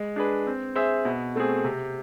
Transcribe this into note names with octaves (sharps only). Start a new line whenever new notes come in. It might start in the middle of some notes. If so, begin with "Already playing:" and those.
Already playing: G#3
D4 G#4 B4
C4
G#4 C5 E5
B2
A3 C4 G#4
C3